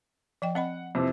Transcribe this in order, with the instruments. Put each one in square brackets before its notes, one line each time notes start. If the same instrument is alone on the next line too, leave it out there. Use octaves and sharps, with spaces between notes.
[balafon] F3 D#5 G5
[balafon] C4 D#5 B5 [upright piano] F#5
[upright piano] F2 C3 E3